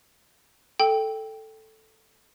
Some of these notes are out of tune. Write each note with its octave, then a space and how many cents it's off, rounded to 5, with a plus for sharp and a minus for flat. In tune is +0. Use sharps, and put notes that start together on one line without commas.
A4 +0 G5 +0